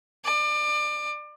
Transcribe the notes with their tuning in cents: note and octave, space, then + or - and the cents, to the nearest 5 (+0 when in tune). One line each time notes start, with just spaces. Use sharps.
D5 +30